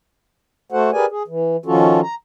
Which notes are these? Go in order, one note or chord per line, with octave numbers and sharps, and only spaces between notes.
A3 F#4 A4 C5 F#5
G4 G#4 A#4 B4 D5 G#5
G#4
E3
D#3 F3 C#4 F4 F#4 A4
A#5